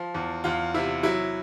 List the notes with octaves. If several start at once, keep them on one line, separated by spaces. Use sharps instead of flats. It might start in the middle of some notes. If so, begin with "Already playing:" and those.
Already playing: F3
E2
E2 F4
C3 E4
F#3 E4